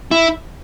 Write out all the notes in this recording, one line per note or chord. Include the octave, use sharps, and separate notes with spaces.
E4